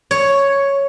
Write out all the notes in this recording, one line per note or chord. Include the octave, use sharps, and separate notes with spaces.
C#5